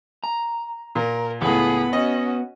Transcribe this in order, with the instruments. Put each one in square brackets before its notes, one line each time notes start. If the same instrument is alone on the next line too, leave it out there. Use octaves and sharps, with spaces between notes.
[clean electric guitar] A#5
[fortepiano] A#2 [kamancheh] A#4
[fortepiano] C#2 A2 [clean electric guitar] B3 [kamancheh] G#4 B5
[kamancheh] C#4 F#4 [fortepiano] D#5